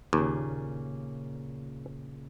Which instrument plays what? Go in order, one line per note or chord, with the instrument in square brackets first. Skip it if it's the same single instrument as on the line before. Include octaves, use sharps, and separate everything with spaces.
[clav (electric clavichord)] D#2 [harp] A#2 C#3